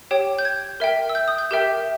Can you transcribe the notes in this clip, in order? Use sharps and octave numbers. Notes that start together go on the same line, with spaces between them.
G4 C#5 G5
G6
G#6
A#4 E5 G5
E6
G6
D#6
G6
G4 A#4 E5 G5 G6